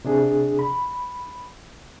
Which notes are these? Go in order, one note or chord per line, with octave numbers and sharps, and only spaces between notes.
C3 D4 G#4
B5